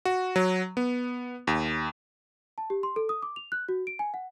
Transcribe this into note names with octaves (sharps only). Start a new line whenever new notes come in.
F#4
F#3
B3
D#2
A5
G4
C6
A4
D#6
D6
F7
F#6
F#4
D7
G#5
F#5